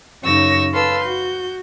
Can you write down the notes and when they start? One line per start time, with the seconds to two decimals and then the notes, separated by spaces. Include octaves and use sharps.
0.22 F#2 C#3 D#4 C#6 E6 A#6
0.72 A4 B4 F5 C6 E6
1.03 F#4 G6